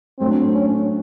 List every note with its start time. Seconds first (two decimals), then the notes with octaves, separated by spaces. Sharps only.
0.19 A2 F#3 A3 C4 D4
0.54 C#4